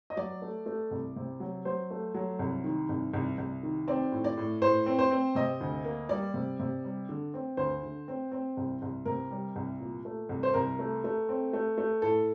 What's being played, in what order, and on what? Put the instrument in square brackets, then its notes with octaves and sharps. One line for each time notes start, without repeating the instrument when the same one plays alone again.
[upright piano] D#5
F#3 D5
A3
A3
C2
C3
F#3
F#3 C5
A3
F#3
C2
D#3
C2
C2
C2
D#3
C4 D5
A2
D5
A2
A2 C5
C4
C5
C4
C3 D#5
D2
A#3
G3 D5
C3
C3
G3
D3
C4
D2 C5
D3
C4
C4
C2
C2
C3 A#4
G3
C2
A#2
A3
C2
C5
C2 A#4
A3
A3
C4
A3
A3
A2 A4